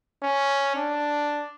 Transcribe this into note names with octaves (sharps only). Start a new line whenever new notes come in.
C#4
D4